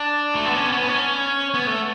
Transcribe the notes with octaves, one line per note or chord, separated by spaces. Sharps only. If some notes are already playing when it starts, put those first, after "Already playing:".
Already playing: D4
A3
B3
C#4
B3
C#4
B3
C#4
B3
A3